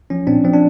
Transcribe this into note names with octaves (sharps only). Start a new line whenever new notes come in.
F3 C#4
A#2 C4 D4
F3 C4
D4